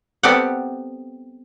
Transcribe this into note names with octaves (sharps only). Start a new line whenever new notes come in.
G3 B3 C4 G4 A4 F#5